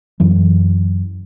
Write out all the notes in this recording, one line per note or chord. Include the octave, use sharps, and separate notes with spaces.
F#2 E3 F#3